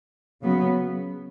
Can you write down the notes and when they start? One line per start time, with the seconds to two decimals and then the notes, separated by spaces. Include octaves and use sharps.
0.43 C#3 F#3 B3